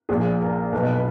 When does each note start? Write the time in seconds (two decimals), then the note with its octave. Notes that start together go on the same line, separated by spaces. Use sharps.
0.09 A#1 A#2 G#4
0.41 A#4
0.73 B1 B2
0.93 B4